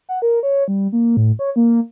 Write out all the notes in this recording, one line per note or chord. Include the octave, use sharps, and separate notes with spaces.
F#5
A#4
C#5
G3
A#3
A2
C#5
A#3